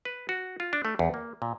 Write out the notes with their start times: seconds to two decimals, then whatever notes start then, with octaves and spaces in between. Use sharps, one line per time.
0.05 B4
0.29 F#4
0.60 F4
0.73 D4
0.85 A3
0.99 E2
1.14 A#3
1.42 A#2